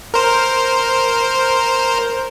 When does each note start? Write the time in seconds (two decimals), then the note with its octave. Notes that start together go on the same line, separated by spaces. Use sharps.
0.14 A#4 C5